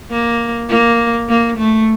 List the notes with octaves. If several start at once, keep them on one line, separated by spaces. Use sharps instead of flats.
A#3
A#3
A#3
A3